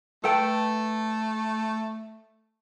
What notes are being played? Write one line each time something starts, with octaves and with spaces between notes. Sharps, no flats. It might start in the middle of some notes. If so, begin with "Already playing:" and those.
A3 A4 B4 G5